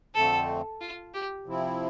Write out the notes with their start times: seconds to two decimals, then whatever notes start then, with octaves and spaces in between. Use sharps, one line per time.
0.15 F2 D3 A3 C4 A4
0.81 F4
1.14 G4
1.46 C3 F3 C4 E4